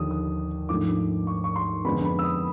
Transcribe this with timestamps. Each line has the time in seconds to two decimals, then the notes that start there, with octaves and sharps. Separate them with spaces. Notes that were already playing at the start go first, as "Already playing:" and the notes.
Already playing: D#2 D3 F3 A#3 D#6
0.11 D#6
0.69 G#2 F3 A3 D4 D6
1.27 C#6
1.44 C#6
1.56 C6
1.85 F2 D3 F3 G#3 B3 B5
2.04 B5
2.19 E6
2.24 D#6